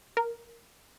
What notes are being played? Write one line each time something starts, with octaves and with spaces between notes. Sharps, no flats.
A#4